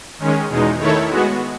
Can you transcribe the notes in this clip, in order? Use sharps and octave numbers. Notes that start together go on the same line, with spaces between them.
D#3 G#3 C#4
E2 B2 G#3 D#4
D#3 A3 E4 A4 C#5
G#3 B3 F#4